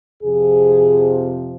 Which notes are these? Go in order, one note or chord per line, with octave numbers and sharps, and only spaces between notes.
F2 C3 F3 G#4